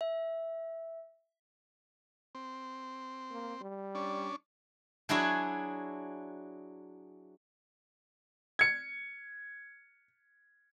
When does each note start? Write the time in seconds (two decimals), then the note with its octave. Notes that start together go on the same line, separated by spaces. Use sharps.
0.01 E5
2.35 C4
3.32 A#3
3.61 G3
3.95 C#4 D4
5.09 F#3 D4 E4 F#4 G#4
8.59 G#6 C#7